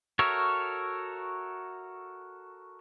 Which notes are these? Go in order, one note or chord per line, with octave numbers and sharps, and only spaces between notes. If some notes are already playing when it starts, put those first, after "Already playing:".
F#4 A4 A#4 C#5 E5